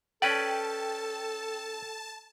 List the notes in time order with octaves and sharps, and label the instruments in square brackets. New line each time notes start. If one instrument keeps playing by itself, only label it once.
[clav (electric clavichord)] C#4 B4 D5 [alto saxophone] A4 [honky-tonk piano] G5 [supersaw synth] A5